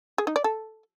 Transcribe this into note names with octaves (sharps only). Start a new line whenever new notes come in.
G#4
D#4
D5
A4